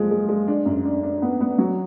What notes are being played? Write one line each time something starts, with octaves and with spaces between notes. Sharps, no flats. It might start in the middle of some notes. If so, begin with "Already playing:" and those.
Already playing: F#1 F3 G#3
G#3
G#3
D4
F#2
D4
D4
B3
B3
F#3